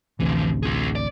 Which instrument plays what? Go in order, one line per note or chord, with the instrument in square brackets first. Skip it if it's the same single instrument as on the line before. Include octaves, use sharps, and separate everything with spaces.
[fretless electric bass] A1 D2 C3 [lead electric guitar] E3 F3
[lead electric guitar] F4 G#4
D5